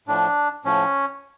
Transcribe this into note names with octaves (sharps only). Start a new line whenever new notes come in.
A2 F3 D4
A2 F3 C#4